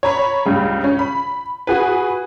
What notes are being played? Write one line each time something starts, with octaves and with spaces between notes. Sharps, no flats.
C#5 A#5 B5
C#2 G2 C#3
C#4
B5
F#4 G#4 B4